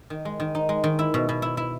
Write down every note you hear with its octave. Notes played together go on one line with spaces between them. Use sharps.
D#3
G#3
D#3
D#4
G#3
D#3
E4
B2
B2
E4
E4